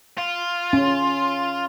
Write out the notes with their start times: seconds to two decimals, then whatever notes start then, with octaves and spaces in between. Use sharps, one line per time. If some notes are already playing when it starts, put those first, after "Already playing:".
0.18 F4
0.73 C#4